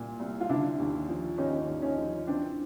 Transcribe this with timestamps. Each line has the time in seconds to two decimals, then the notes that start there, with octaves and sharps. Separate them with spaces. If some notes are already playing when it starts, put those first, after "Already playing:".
Already playing: C2 A#2
0.20 C2
0.41 F4
0.49 D3 D4 E4
0.79 D#2
1.08 F3
1.38 D#2 C#4 D#4
1.68 D#2
1.82 C#4 D#4
1.97 F3
2.27 E3 C4 D4